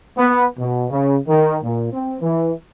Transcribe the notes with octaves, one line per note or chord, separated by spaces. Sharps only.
B3
B2
C#3
D#3
A#2
C4
E3